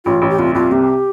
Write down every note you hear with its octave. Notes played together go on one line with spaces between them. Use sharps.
A1 F4
A1
G4
C2 F4
C2 F4
C3 G4